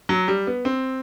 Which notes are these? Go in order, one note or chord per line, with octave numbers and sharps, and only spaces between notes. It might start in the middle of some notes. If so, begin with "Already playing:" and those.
F#3
G3
B3
C4